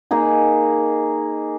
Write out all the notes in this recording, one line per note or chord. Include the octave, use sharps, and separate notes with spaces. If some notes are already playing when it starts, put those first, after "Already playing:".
A#3 D#4 G#4 G#5